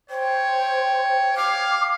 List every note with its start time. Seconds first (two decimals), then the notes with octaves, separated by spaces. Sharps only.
0.10 C5 C#5 G5
1.37 F5 D6